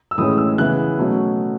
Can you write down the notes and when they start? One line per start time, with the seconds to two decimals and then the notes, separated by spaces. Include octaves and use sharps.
0.11 E6
0.18 A2 E3 G#3 C#4 D#6
0.38 E6
0.58 C#3 E3 B3 E4 F#6
0.99 B2 F#3 A3 C#4